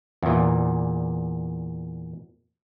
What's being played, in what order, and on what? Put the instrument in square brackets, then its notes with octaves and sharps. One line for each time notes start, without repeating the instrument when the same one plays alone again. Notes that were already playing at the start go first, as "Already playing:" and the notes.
[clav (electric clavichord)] E2 A#2